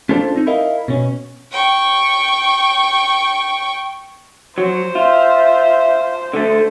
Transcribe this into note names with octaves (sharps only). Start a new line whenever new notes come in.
C#4 D4 F4 A4 C5 D5
C4 D#4
E4 A#4 D#5 F5
B2 C#4
G5 C#6
F#3 C5
F4 E5
D3 A3